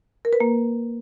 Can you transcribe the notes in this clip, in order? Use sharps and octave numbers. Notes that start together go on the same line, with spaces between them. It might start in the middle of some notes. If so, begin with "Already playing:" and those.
A#4
B4
A#3